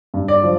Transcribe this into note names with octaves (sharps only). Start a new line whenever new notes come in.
G2
D5
F3